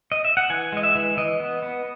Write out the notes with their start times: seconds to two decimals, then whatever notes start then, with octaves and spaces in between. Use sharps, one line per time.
0.12 D#5
0.24 E5
0.37 F#5
0.50 E3 G#5
0.72 G#3 D#5
0.83 E5
0.95 E3
1.17 E3 D#5
1.40 B3
1.62 B3